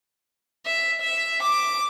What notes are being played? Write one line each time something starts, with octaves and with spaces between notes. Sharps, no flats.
E5
E5
D6